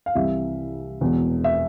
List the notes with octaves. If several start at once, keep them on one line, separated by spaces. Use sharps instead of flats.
F5
C2 C3 E3 E5
E1 E2 B2
E5